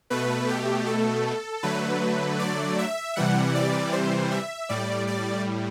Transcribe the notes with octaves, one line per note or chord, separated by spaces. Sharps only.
B2 A3 B4
G4
A4
D3 F#3 A3 B4
D5
E5
C3 E3 G3 F#5
D5
C5
E5
A2 G3 D5
D5